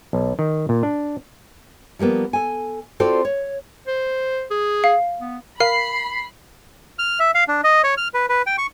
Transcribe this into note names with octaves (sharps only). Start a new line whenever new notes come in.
B1
D#3
A#2
D4
F3 G3 A#3 B3
A4 G#5
C4 F4 F#4 A4 C5 D5
C#5
C5
G#4
F5
B3
A#4 F5 B5 C7
F6
E5
F5
D4
D#5
C#5
F6
B4
B4
G5
C#6